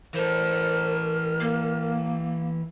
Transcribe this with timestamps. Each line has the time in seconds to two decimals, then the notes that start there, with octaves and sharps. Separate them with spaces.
0.14 E3 A4 A#4 C5
1.40 A#3